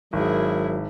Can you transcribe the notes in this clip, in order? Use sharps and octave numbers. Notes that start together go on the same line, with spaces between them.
G#1 F#3 E4 G#4 A#4